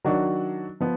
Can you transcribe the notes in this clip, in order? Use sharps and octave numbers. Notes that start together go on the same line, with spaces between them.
D#3 F#3 D4 F#4
F3 B3